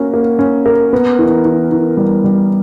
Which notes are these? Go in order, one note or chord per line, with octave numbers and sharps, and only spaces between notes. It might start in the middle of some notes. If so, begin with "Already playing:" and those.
Already playing: A#3 C#4 F#4 A#4
A#3
C#4
A#4
B3
E3
E3
E3
G3
G3